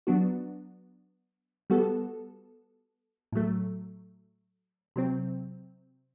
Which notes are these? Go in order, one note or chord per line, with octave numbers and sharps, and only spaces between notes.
F#3 B3 D4 F#4
G3 B3 F#4 A4
A2 F#3 A3
C3 F#3 C4